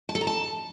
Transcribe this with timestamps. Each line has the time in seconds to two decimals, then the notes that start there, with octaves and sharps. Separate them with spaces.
0.09 A5
0.15 A4
0.21 A#5
0.27 A5